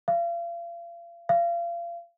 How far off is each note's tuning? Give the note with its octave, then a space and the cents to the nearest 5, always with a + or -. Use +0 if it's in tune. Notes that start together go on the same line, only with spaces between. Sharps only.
F5 -35
F5 -30